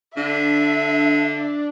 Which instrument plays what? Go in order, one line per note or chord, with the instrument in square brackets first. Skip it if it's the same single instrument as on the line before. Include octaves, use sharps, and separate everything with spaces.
[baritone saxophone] D3 [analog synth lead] D4 [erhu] E5